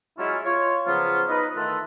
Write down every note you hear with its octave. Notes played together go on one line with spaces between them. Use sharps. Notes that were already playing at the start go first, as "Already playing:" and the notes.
F#3 G#3 C#4 E4 F4
F4 C#5
C#3 F3 F#3 B3 F4
D#4 B4 D#5
D#3 E3 A3 F4 A4 B4